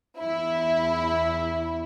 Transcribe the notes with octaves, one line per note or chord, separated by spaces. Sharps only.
E2 E4